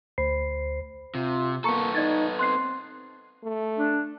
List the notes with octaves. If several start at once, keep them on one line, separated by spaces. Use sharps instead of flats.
D2 C5 B5 C7
C3 F4
A#3 B3 A4 A#5 C#6 C#7
D#4 D5 G#6 A6
C4 C6 F#6 C7
A3
D4